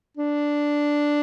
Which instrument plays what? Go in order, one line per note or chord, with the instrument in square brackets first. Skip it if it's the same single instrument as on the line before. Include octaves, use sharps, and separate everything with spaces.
[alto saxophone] D4